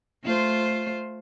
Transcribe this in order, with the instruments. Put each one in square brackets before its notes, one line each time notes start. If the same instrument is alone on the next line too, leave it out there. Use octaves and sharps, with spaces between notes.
[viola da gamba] A3 F4 C5